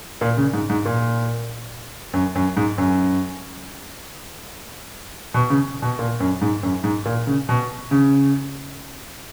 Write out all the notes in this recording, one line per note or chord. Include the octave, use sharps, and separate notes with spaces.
A#2
C#3
G#2
G#2
A#2
F#2
F#2
G#2
F#2
B2
C#3
B2
A#2
F#2
G#2
F#2
G#2
A#2
C#3
B2
C#3